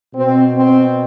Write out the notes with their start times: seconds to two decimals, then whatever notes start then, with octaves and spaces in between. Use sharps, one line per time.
0.14 B2 C4
0.55 C4